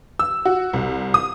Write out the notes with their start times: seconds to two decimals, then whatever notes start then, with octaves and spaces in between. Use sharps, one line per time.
0.19 E6
0.45 F#4
0.73 C2
1.14 D#6